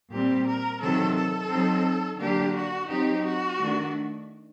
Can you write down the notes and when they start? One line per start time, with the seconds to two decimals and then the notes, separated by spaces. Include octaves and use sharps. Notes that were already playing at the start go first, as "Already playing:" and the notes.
0.11 A#2 G3 C4 G4
0.47 A#4
0.81 C3 D#3 F#3 C4 A4
1.16 A4
1.50 F#3 C4 D#4
2.20 D3 F#3 A#3 D4 G4
2.56 F#4
2.90 F#3 C4 D#4 G4
3.25 F#4
3.59 D#3 A3 D4